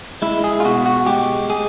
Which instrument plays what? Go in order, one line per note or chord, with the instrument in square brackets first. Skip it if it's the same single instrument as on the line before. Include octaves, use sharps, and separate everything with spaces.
[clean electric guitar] G#3 E4
G#4
F4
B2 F#4
F#4
G#3 G4
G#3 G#4